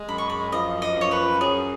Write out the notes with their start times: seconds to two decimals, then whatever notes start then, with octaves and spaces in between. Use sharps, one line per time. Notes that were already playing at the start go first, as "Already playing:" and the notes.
Already playing: G#3
0.08 F#2 B5
0.18 C#6
0.30 B5
0.52 F3 D#5
0.82 D#5
0.96 F#2
1.01 C#5
1.11 B4
1.40 F#3 G#4